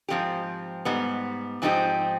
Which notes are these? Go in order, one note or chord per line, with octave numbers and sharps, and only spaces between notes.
G#2 F3 C4 G4
G#2 G3 B3
G#2 F3 C4 D#4 G4